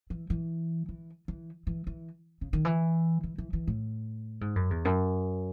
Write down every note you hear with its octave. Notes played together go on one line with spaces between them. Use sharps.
E3
E3
E3
E3
E3
E3
C#3
D#3
E3
E3
E3
E3
A2
G#2
F#2
E2
F#2